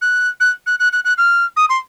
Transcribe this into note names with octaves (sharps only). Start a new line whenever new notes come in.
F#6
F#6
F#6
F#6
F#6
F#6
F6
D#6
C6